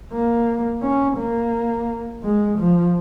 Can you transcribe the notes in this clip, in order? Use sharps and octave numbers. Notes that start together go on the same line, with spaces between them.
A#3
C#4
A#3
G#3
F3